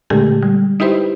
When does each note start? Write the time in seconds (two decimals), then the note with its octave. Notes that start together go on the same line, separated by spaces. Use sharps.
0.10 A#2 D3 G#3 A3 G4
0.42 G3
0.80 D#4 E4 G4 B4 C5